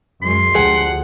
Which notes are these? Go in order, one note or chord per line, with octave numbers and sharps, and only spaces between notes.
F#2 G#3 C6
D2 F3 G4 G#4 F#5